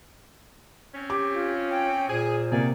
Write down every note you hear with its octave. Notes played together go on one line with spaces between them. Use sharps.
C4 C#4
G4 D6
F4
G5
A#2 G#4 C5
C3 D#3 A#3 G#4 D5